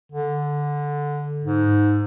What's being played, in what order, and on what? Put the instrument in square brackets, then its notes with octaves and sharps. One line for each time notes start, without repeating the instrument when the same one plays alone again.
[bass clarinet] D3
G#2